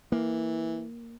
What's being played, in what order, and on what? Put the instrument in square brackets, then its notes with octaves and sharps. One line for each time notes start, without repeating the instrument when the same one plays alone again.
[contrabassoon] E3 [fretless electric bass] A#3